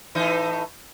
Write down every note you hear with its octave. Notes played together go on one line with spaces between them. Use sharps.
A2 E3 D#4